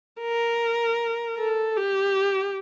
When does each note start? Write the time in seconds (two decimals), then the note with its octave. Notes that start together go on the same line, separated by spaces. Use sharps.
0.21 A#4
1.38 A4
1.77 G4